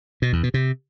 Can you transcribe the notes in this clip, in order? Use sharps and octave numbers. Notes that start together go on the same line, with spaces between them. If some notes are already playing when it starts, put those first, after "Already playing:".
B2
E2
B2
C3